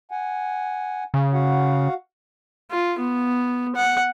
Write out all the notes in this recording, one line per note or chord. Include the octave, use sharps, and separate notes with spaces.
F#5 G#5
C#3
F#4 F5 F#5
F4
B3
F#5